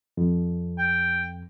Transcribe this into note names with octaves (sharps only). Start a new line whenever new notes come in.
F2
G5